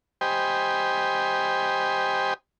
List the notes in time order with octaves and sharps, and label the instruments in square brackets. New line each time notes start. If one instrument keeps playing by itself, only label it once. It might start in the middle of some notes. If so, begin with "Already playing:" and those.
[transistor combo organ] G4 C5 D#5 G5 G#5 B5